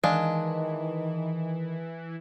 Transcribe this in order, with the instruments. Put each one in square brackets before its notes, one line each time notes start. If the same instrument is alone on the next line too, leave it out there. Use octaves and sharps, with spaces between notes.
[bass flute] D#3 [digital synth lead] E3 [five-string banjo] G#3 D4 F5